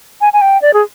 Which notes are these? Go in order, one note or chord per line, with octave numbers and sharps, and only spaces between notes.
G#5
G#5
G5
D5
G#4